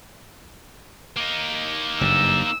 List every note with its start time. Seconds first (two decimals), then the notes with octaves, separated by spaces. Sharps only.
1.17 A#3 D#4
2.01 F#1 G2 E6